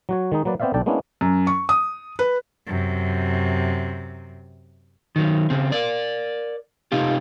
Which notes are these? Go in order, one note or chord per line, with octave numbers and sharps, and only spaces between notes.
F#3 F#4 C#5
D#3 G#3 D#4
F#3 A#3 B4 D5
B3 C4 C5 D5 E5 F5
B1 D4 A4 D5 G5 A5
G#3 A#3 B3 C#4 D4 E4
F#2
C#6
D#6
B4
F#2 C3
D#3 F#3
C#3 C4
A#4 D5
C3 D#4 F4 G4